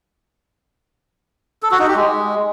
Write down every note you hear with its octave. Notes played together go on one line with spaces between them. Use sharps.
A4
F#4
D#4
G4
G#3